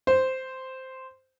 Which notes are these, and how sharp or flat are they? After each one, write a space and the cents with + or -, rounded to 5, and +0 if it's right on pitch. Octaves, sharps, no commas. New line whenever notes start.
C5 -5